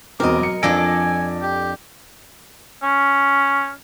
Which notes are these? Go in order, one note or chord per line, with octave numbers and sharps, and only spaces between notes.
E1 B2 C4 A#4 D#5 D6
F#3 C#7
F2 F3 D4 A4 G#5 A#6 D7
G4
C#4